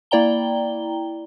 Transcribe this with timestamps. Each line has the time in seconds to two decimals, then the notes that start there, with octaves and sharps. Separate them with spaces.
0.11 A#3 E4 D5 G5 A#5 G7